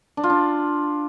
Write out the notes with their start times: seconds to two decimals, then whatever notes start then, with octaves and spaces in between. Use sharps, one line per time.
0.17 D4
0.24 F4
0.30 D4